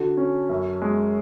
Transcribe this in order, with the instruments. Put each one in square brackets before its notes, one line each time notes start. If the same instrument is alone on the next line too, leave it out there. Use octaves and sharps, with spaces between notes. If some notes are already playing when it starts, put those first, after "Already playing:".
Already playing: [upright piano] D3 [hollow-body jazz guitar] F#4 A4
[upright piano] C#4
F#2
G#3